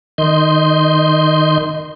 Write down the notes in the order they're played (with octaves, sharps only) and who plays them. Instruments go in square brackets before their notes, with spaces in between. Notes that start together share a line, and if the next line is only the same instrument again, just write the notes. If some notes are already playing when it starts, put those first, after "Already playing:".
[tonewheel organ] D#3 D#5 C6 G6